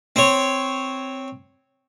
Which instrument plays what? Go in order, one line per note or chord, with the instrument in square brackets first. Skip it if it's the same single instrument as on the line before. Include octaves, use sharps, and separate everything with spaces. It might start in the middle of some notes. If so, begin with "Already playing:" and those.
[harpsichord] C4 C#5